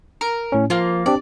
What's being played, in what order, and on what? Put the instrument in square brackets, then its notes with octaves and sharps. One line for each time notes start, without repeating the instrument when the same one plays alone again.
[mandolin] A#4
[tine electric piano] A2 C#4
[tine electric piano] F3 [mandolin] A#3 F4
[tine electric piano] C4 D4 G4 [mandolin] D5